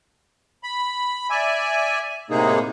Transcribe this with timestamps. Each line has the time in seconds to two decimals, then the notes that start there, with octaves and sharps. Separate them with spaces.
0.63 B5
1.30 D5 E5 G#5
2.30 A2 C3 G#3 A#3 D#4 G#4